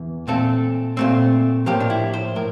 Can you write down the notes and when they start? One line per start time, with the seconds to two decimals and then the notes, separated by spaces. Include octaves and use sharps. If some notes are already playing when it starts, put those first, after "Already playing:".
Already playing: E2 E3
0.27 A#2 A3 C4 A4
0.97 A#2 A3 C4
1.66 A2 F3 A#3 G4
1.80 D4
1.90 E4
2.14 C5
2.36 A2 A#4